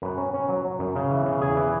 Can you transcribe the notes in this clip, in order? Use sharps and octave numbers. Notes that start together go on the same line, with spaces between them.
F#2 B4
C#4
C#4
F#3
F#3
F#2
C#3
E3
C#3
E2 G#4
E3